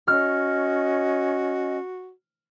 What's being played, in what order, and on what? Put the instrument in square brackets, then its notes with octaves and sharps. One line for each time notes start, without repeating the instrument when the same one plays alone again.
[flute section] C#4 D#5 [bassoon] F#4 [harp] F6